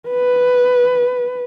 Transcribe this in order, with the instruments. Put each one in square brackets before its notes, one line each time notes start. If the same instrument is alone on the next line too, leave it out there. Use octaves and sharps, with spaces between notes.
[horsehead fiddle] B4